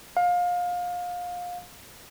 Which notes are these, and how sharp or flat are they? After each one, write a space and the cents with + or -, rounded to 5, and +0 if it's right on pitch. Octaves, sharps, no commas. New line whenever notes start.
F5 +25